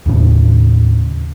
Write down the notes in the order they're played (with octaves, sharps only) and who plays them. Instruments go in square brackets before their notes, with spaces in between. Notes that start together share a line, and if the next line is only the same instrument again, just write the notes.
[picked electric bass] D#2 A2 C#3